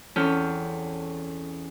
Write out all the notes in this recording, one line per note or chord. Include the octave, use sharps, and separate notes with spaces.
E2 C4 C#4 A4 G5 F6